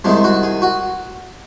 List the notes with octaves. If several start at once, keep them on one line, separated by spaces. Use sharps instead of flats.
C2 C3 D#3 G#3
F#4
G#4
F#4